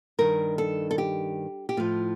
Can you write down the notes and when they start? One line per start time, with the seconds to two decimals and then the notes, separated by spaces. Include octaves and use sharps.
0.18 G2 D#3 A#4
0.58 A4
0.91 A4
0.98 G4
1.69 G4
1.77 A2 F3 F4